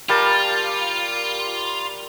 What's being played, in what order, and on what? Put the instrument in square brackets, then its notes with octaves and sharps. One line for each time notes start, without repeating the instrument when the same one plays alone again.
[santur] G3 A#4 A5 [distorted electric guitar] F4